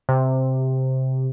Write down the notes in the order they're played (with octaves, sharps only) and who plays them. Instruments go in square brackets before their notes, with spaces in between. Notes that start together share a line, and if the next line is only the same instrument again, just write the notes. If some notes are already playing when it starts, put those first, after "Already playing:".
[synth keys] C3